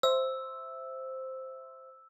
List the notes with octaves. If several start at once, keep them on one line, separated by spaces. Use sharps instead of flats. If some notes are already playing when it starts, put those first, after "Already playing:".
C5 E5 E6